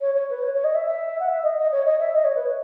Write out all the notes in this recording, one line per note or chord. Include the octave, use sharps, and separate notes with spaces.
C#5
C#5
B4
C#5
C#5
D#5
E5
E5
F#5
E5
D#5
D#5
C#5
D#5
E5
D#5
C#5
B4
C#5